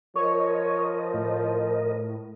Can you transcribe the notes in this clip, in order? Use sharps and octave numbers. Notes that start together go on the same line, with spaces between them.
F3 A#4 C#5 D#5
A2